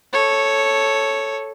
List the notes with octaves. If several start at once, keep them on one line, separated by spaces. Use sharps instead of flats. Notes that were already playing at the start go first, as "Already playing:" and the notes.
A4 C#5